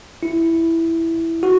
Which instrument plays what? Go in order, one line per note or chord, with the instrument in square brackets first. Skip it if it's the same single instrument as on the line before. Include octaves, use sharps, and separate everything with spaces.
[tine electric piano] E4
F#4